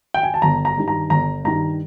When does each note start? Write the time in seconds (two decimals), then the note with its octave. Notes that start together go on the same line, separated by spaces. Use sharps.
0.14 G5
0.23 G#5
0.34 A5
0.42 G1 A#5
0.65 A#5
0.77 G2 D#3
0.88 A#5
1.10 G1 A#5
1.44 G2 D#3 A#5